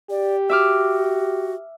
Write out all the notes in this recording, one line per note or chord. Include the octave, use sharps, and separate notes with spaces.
G4 D5
F#4 E5 D6 F6